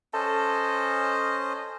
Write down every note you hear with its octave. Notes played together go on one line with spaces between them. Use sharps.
C#4 A4 C5 D#5